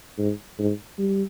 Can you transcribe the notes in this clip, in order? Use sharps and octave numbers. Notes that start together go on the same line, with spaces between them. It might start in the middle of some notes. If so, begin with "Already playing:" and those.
G#2
G#2
G3